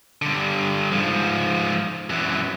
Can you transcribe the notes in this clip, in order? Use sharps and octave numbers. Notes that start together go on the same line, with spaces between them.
G2 D3
G#2 F3
F#2 E3